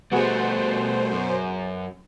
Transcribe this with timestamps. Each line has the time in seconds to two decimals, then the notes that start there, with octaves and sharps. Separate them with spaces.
0.12 B2 G3 A3 B3 F#4 G#4 C5
1.11 F#2